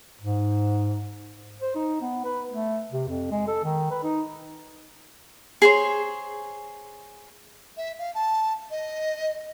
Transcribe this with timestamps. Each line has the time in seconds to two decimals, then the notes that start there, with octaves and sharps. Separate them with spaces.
0.21 G#2
1.62 C5
1.75 D#4
2.01 B3
2.24 B4
2.51 A3
2.92 C3
3.08 F2
3.31 G#3
3.47 A4
3.64 D#3
3.91 B4
4.03 D#4
5.62 G#4 C5 C#5
7.77 E5
7.99 F5
8.15 A5
8.71 D#5